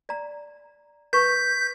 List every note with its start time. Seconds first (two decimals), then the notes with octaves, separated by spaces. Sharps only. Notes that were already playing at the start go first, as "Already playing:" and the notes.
0.09 D5 A#5
1.13 B4 C#6 G6 B6